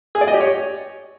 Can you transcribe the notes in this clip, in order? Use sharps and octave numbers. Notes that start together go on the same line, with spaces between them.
G#4
D5
D#5
G4
C#5